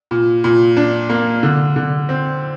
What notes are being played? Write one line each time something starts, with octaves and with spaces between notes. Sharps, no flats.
A#2
A#2
D4
A#3
D3
D3
C4